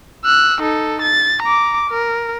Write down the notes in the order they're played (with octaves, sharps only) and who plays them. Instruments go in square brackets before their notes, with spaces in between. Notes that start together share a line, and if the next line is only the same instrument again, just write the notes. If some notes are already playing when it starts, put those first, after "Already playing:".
[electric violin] E6 F#6
D#4 A4
A6
A#5 D6
A#4